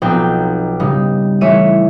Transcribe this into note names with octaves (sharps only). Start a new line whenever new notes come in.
B1 F3 C4 D#4 G5
G2 C#3 D#4
E3 A3 C#5 E5 D#7